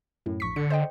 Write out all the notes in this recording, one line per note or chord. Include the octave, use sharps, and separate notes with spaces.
F#2 A2
A#1 C#6 B6
D3 C#7
C5 D#5 G5